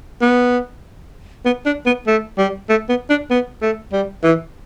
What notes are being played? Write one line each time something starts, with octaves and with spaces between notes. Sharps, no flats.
B3
B3
D4
B3
A3
G3
A3
B3
D4
B3
A3
G3
E3